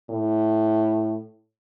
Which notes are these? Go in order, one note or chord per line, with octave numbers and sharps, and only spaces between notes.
A2